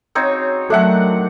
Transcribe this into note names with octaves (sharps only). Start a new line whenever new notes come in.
C#3 C4 D#4 F#4 C#5 D5
D3 D#3 F#3 A3 D4 A4 E5 F#5